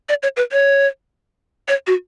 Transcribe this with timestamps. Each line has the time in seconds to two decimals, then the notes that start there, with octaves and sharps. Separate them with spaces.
0.09 D5
0.23 C#5
0.37 B4
0.52 C#5
1.68 C#5
1.87 F#4